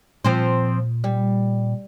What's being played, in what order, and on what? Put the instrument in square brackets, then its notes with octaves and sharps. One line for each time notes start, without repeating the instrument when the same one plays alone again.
[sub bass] A#2 [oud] F3 C4 C5
[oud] G3